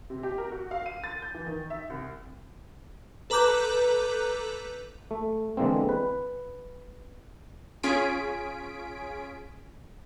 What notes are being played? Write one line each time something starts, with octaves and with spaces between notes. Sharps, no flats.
C3
G4
A#4
F#4
F5
D#7
A6
G6
E3
D#3
E5
C2
A4 B4 A#5 D6 F#6 G6
A3
D3 E3 G#3 A#3 C4
B4
C#4 F4 G#4 G#5 B6 D7